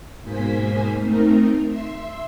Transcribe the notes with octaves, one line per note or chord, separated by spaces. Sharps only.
G#2 B2 A#3 C5 G#5 B6
A3 C4 D#4 A#4
E5 C6